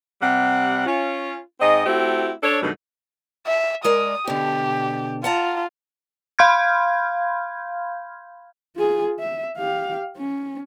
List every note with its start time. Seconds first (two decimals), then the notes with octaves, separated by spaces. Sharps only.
0.21 C3 G3 F#5
0.86 C#4 F4
1.60 G#2 C4 D#5
1.86 A3 C4 E4 F#4 G4
2.42 D4 A4 C#5
2.62 G2 B2 D#3 F#3 A3
3.47 E5
3.84 G#3 A#4 D5 D#6
4.27 B2 D3 G4
5.24 F4 F#5 A5 A#5
6.39 F5 B5 C6 F6 G6 G#6
8.76 F4 G#4
9.19 E5
9.58 G4 F5
10.17 C#4